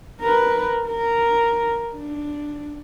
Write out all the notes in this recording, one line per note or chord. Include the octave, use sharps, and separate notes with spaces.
A#4 B4
A#4
D4